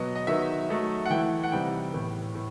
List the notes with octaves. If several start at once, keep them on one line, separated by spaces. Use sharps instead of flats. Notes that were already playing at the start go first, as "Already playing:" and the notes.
Already playing: B2 F#3 B3 D#5
D#5
D#3 F#3 B3 D#4 E5
F#3 A3 D#4
F#5
E3 A3 E4 G5
F#5
C3 E3 G3 D#4 G5
A2 E3 B3
A2